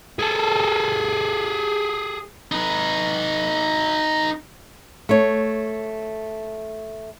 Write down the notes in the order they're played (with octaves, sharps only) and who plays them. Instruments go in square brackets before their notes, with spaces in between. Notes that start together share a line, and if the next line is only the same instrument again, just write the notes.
[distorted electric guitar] G#4 A4
[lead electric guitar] D#4 B4
[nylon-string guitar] A3 C#5